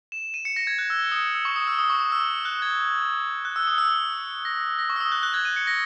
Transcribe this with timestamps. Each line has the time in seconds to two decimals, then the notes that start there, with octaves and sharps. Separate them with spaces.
0.12 E7
0.34 D#7
0.45 C#7
0.56 A#6
0.67 G#6
0.79 F#6
0.90 E6
1.12 D#6
1.35 E6
1.45 C#6
1.56 D#6
1.67 E6
1.79 D#6
1.90 C#6
2.00 D#6
2.12 E6
2.45 F#6
2.62 G#6
3.45 F#6
3.56 E6
3.67 D#6
3.78 E6
4.45 A#6
4.79 A#6
4.90 C#6
4.96 E6
5.00 D#6
5.12 F#6
5.23 F#6
5.34 G#6
5.45 D#7
5.56 C#7
5.67 A#6